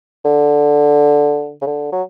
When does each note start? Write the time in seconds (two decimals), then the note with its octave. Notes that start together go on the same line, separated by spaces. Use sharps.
0.25 D3
1.62 C#3
1.66 D3
1.92 F#3